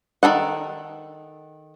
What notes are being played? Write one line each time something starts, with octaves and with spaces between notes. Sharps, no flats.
D#3 E3 A4 F#5